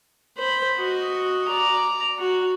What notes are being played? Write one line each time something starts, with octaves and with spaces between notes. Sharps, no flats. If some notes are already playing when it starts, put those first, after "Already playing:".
C5 B5
F#4 D#5
D5 A#5
F#4